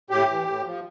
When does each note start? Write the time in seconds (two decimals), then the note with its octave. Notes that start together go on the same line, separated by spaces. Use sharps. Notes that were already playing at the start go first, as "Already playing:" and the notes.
0.10 A2 G4
0.29 E3
0.46 A2
0.65 F3